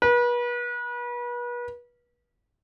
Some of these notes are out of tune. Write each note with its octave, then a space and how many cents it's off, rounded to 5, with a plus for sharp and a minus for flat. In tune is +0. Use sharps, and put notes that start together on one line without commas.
B4 -35